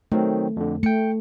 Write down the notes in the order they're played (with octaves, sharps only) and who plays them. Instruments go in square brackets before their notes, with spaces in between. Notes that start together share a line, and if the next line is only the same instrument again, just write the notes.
[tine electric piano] D#3 F#3 C4 [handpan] A3
[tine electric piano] F2 D3
[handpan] A3 [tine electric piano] G5 C#7